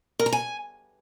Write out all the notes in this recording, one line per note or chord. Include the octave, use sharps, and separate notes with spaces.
A#4
A#5
G#5